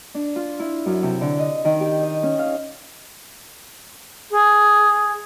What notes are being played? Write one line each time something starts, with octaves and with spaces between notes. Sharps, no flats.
D4
F4
E4
F#2
C3
D3
D#5
D#3
G4
D#5
C#4
F5
G#4